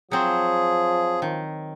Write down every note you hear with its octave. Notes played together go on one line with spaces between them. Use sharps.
F3 F#3 C4 G#4
D#3